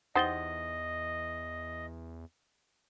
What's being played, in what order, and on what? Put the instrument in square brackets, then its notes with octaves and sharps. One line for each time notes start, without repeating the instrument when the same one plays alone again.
[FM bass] E2 [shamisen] D#4 G4 C5 [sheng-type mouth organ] D#5 [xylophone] F#5 A6 G7